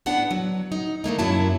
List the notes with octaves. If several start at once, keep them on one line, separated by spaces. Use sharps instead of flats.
A2 B3 D4 F#5
F#3
D#4
D3 A3 A#3 D#4
F#2 F#3 A#3 E4 A5